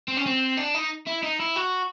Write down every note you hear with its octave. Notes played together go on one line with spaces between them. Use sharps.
C4
C#4
C4
D4
D#4
E4
D#4
E4
F#4